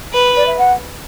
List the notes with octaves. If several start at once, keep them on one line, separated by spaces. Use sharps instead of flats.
B4
D5
E5
F#5